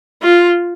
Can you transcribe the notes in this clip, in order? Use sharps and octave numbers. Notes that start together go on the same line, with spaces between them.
F4